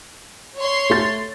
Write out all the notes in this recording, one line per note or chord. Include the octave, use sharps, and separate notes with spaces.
C#5 C6
A3 A6